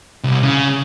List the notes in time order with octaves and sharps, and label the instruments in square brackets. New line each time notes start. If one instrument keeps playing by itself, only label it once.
[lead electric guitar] C2
C#3